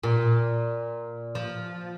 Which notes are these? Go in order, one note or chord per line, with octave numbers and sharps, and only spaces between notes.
A#2
F3